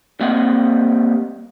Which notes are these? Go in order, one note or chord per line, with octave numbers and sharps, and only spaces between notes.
G3 A#3 C4 D#5 F#5